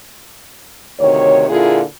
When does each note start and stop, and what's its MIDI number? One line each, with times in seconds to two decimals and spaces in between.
0.99 1.45 38
0.99 1.45 48
0.99 1.45 51
0.99 1.45 73
1.48 1.82 46
1.48 1.82 50
1.48 1.82 58
1.48 1.82 64
1.48 1.82 65
1.48 1.82 68